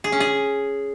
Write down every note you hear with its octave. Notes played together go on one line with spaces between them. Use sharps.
G#4
C#4
G#4